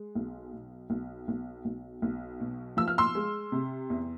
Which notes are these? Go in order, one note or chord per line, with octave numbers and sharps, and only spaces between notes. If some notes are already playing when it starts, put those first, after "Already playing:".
Already playing: G#3
B1
B2
B1
B1
B1
B1
B2
F3 E6
F6
C6 E6
G#3
C3
E2